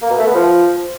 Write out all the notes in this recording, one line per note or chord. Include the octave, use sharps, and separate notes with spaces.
A#3
B2
A3
B3
F3